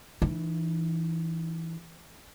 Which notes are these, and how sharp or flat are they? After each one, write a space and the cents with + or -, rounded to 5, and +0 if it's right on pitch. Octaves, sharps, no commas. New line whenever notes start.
E3 +0 D#4 -45